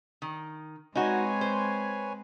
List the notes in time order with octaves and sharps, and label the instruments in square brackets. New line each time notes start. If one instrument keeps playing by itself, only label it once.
[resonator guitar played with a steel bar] D#3
[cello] G#3 C4 [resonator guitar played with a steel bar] D#4 F#4 [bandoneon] B4 C#5 G#5
[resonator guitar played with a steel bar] C5